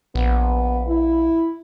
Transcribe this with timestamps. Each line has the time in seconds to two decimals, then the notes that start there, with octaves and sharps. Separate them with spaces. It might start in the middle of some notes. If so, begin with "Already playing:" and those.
0.15 A#1 B3
0.88 E4